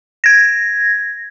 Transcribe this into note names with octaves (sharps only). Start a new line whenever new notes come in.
G#6 A#6